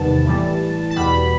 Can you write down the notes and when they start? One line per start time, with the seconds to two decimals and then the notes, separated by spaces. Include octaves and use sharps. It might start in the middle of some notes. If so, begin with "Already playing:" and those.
Already playing: E2 C3 D#3 G3 B3 A5
0.24 A2 E3 G3
0.91 A5
0.96 E2 B2 G3 B3 B5